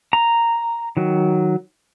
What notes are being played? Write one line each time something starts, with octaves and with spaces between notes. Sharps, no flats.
A#5
D#3 F#3